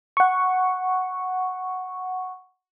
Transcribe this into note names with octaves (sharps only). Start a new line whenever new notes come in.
F#5 C#6